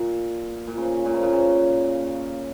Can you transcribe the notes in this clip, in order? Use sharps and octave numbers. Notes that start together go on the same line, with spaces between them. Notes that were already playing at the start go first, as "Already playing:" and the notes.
Already playing: A#2
A#2
C#3
A#2
C#3
A#2
C#3